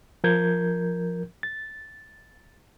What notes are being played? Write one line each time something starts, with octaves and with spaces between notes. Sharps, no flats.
F3 A#4 G6 G#6
A6